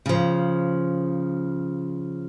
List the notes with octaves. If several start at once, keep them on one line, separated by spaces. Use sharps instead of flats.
C#3 F3